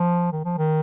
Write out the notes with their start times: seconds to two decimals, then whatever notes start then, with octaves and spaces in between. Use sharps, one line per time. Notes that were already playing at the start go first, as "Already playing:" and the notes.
Already playing: F3
0.32 D#3
0.45 F3
0.58 D#3